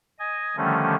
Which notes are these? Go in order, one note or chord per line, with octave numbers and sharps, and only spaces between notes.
D#5 G#5
D3 D#3 F3 G3 A3 C#4